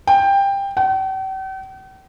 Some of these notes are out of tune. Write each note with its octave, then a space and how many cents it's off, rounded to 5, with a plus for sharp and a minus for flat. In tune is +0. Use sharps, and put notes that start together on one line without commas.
G5 +15
G5 -45